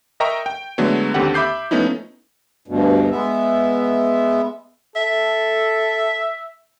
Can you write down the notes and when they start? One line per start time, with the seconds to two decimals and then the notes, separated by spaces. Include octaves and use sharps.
0.20 A#4 D#5 E5 G5 A#5 C#6
0.46 G5
0.78 D3 F#3 G#3 A3 B3
1.14 D#2 D3 C4 G4 F#5
1.34 E5 B5 D6 G6 C7
1.71 F3 A3 B3 C#4 D#4 E4
2.68 D2 G2 B2
3.11 G#3 B3 E5
4.96 A4 E5